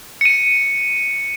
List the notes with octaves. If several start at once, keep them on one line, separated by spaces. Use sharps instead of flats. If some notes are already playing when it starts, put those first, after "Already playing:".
C#7 D#7